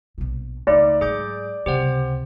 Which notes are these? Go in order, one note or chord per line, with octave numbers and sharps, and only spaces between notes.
A#1 B2
C#2 A3 D#4 D5
G#2 F#3 G#4 D6 G6
C#2 C3 G4 C5 F#5